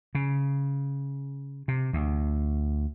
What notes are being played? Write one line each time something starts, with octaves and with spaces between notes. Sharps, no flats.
C#3
C3
D2